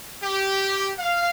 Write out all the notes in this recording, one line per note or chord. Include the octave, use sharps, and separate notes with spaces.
G4
F5